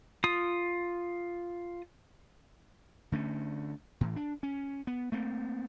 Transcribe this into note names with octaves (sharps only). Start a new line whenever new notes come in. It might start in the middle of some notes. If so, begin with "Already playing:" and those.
F4 D#6
D3 A3 C#4
A2 E3
D4
C#4
B3
A3 A#3 C4